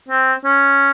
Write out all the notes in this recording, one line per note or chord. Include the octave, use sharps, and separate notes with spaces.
C4
C#4